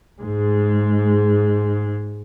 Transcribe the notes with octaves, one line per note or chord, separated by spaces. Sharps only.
G#2 G#3